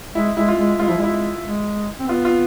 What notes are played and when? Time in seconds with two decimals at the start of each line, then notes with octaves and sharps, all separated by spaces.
0.15 G#3 E4
0.37 G#3 E4
0.48 F4
0.58 G#3
0.79 G#3 F4
0.88 F3 E4
0.97 G#3
1.03 E4
1.44 G#3
2.00 C4
2.08 B3 F4
2.25 F4